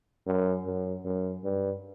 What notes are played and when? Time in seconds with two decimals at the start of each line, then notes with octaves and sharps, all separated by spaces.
0.27 F#2
0.66 F#2
1.05 F#2
1.44 G2